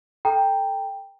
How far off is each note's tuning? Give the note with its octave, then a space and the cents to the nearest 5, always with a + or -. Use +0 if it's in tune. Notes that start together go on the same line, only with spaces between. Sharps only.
A4 +0 G5 +5 A#5 -10